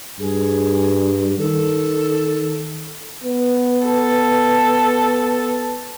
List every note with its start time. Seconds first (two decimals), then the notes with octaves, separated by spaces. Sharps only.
0.20 G2 G#4
1.39 D#3 A4
3.24 B3
3.85 A4